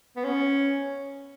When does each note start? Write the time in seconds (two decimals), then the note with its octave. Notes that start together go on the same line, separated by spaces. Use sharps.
0.16 B3
0.24 C#4